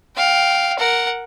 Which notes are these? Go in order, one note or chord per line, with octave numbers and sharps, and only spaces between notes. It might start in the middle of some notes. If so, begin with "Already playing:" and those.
F5 G5
A#4 F#5